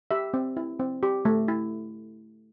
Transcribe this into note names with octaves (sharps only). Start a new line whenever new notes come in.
G4 E5
C4
E4
C4
G4
A3
E4